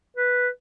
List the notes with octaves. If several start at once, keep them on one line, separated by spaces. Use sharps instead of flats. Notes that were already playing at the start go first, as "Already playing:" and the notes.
B4